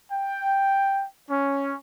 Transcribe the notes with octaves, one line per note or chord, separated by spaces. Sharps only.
G5
C#4